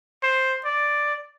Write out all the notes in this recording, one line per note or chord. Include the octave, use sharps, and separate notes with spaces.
C5
D5